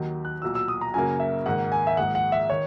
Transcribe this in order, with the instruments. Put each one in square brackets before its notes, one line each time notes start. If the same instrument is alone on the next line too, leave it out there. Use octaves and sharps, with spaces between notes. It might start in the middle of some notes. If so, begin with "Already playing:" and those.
Already playing: [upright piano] D#2 D#3 F#3
[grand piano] F#6
[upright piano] B1 A#2 F#3 [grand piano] E6
[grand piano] E6
D#6
A#5
[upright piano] F#2 C#3 F#3 A#3 [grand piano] G#5
[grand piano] E5
[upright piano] G#2 D#3 A#3 [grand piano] F#5
[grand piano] G#5
E5
[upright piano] A#1 G#2 D#3 G#3 [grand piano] F#5
[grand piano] F#5
E5
[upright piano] D#3 [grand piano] C#5